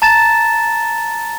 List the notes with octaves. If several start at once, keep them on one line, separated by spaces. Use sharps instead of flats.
A5 A#5 A6 E7